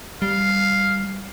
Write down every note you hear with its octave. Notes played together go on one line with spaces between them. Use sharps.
G3 F5